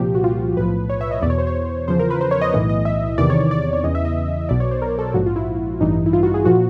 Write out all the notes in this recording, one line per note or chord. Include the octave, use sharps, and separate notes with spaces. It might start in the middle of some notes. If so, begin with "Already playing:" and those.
Already playing: C2 A#2 F3 G4
F#4
F4
B1 A2 F3 B4
C#5
E5
D#5
E2 B2 C#5 D5
C5
C#5
E2 C#3 F3 C5
A#4
B4
C5
C#5
D#5
B1 A2 E3 D#5
D#5
E5
E2 C3 D#3 D5
C#5
C#5
D5
D5
C#5
E2 C#3 E3 D#5
E5
D#5
B1 B2 D5
C#5
C5
A#4
A4
A#1 G#2 F3 F#4
F4
E4
A1 G2 E3 D#4
E4
F4
F#4
G#4
A#2 F3 F#4